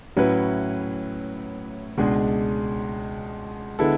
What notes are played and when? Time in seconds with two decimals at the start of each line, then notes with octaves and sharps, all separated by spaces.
0.17 A2 F#3 C#4 E4 B4
1.97 C#2 B2 G#3 D4 G#4
3.79 D3 G#3 B3 E4 A4